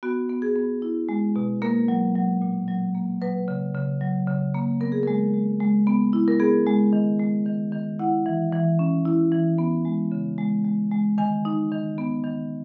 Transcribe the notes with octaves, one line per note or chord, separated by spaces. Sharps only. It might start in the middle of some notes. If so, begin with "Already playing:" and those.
B3 F#4
B3
G#4
B3
E4
G#3
B2
A#3 A#4
F#3
F#3
A#2
F#3
A#3
F#3 B4
C#3
C#3
F#3
C#3
A#3
B3 A#4
G#4
G#3 A#4
G#3
G#3
B3
E4
A#4
B3 G#4
G#3
D#3
G#3
D#3
D#3
E4 F#5
E3
E3
C#4
E4
E3
B3
G#3
C#3
G#3
G#3
G#3
D#3 G#5
D#4
D#3
B3
D#3